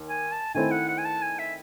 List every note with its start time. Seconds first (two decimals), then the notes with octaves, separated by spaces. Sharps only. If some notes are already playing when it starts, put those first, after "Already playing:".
Already playing: D#2
0.09 G#5
0.32 A5
0.54 D#3 A3 C4 E4 C5 G#5
0.71 F#5
0.88 F#5
0.98 G#5
1.05 A5
1.22 G#5
1.39 E5